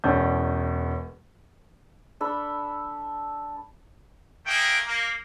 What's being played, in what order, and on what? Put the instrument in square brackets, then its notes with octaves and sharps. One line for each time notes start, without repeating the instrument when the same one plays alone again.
[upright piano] E1 E2 C#4 D5 A5 G6
[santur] D4 A4 B5
[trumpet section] A3 A#3 G#4 G5
A#3